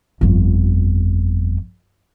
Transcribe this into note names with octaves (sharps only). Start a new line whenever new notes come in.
G1 F2